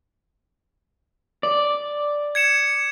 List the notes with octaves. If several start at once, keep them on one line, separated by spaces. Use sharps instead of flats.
D5
G#6 C#7 E7